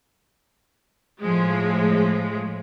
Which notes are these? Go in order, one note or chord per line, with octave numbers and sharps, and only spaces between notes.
A2 F3 G#3